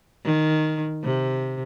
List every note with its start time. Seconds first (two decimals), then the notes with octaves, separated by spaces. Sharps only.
0.24 D#3
1.04 C3